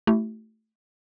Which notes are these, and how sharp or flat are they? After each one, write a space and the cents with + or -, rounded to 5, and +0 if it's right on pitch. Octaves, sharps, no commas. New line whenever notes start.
A3 +0 E4 +0 G4 -35